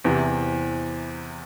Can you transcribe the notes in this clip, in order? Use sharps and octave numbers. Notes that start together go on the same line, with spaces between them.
E2 C3 E3